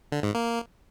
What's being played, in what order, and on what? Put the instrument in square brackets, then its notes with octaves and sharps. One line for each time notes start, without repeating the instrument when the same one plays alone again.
[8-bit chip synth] D3
G#2
A#3